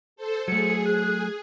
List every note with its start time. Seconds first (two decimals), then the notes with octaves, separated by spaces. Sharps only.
0.16 A4 C5
0.48 F#3 A3 G#4 C#7
0.86 F#6